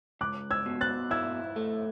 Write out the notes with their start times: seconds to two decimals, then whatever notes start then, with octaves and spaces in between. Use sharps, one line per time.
0.21 C#2 D6 F#6
0.51 E6 G#6
0.66 B2
0.81 F#6 A6
1.11 E4 E6 G#6
1.56 A3